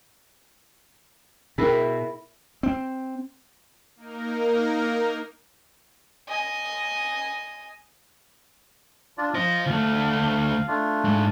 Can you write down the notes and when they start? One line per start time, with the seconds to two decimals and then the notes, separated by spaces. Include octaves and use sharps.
1.58 B2 E4 G#4 A#4 G5
2.63 C4
3.96 A#3 D#4 A#4
6.28 D#5 G#5
9.18 D4 F4 D5
9.34 F4 C5 D#5
9.66 D2 A3 F5
10.68 A3 D4 F4
11.04 G#2